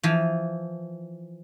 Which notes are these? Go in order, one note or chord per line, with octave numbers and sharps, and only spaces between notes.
E3 F3